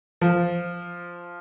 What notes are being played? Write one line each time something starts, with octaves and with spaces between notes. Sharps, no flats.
F3